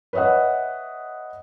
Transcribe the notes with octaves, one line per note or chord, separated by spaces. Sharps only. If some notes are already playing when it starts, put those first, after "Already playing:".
B4 C#5 D#5 E5 F#5